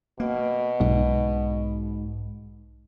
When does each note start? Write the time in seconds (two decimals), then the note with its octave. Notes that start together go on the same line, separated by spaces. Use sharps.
0.20 B2 A#3
0.80 B1 G#2